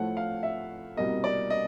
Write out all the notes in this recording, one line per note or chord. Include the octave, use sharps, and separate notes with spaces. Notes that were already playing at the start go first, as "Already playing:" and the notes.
Already playing: A2 F3 A3 F#5
F5
E5
C2 B2 G3 A#3 D#5
D5
D#5